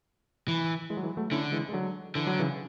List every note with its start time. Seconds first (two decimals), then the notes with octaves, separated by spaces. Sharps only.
0.48 E3
0.90 E3 G#3
0.97 F#3
1.03 E3 G#3
1.17 F#3 A3
1.31 D3 C#4 E4
1.52 E3 G#3
1.69 G#3
1.73 D3 F#3
2.15 D3 E3
2.27 F#3
2.39 C#3 E3